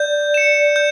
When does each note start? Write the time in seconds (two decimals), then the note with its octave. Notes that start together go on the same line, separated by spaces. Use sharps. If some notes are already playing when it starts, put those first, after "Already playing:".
Already playing: D5 G6
0.34 C#7 E7
0.76 G6